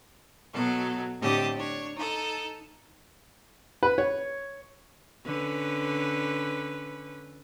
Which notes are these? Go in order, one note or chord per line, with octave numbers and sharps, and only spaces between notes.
B2 F#3 A4
A2 D3 C4 G4 D#5 A5
D4 C#5
D#4 A4
B4
C#5
D3 C#4 B4